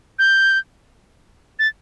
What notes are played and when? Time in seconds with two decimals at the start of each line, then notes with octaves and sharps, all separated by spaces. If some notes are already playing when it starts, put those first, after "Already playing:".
0.19 G6
1.59 A6